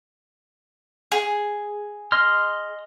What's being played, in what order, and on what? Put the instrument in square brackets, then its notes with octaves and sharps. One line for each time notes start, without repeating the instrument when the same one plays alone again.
[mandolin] G#4
[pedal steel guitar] D#5 C6 F6